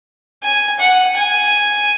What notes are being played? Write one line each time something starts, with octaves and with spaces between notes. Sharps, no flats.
G#5
F#5
G#5